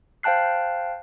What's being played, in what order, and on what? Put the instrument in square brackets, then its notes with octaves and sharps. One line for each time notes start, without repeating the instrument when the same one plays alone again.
[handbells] C5 F5 G5 A5 F#6 C7